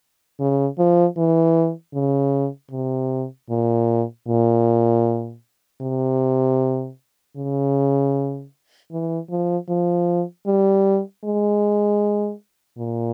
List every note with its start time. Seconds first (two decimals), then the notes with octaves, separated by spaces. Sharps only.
0.40 C#3
0.79 F3
1.17 E3
1.94 C#3
2.71 C3
3.50 A#2
4.27 A#2
5.82 C3
7.37 C#3
8.92 E3
9.30 F3
9.69 F3
10.46 G3
11.24 G#3
12.78 A#2